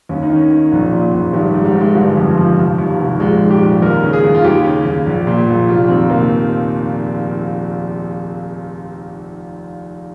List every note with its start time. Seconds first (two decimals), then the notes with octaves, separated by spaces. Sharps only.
0.09 D#2 C#4
0.23 D#4
0.30 D#3
0.35 C#4
0.51 D#3
0.72 A#1
0.92 A#2
1.14 A#1
1.33 G#1 G3
1.49 G#2 G3
1.65 G3
1.75 G#1
1.81 G#3
1.95 G1 G3
2.17 F2
2.37 F3
2.58 F1
2.78 D#2
3.00 F1
3.20 A#1 G#3
3.41 G#2
3.51 G4
3.61 A#1
3.82 D#2 A#4
4.03 C#3
4.13 G#4
4.24 D#2
4.34 F4
4.44 D#2 G4
4.64 C#3
4.86 D#2
5.07 A#1
5.27 A#2
5.48 A#1
5.68 F1 F4
5.88 D#2 C4
6.10 F1 A#3